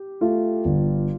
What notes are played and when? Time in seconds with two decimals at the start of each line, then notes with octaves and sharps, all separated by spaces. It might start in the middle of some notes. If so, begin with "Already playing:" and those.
Already playing: G4
0.21 A3 F4
0.65 G1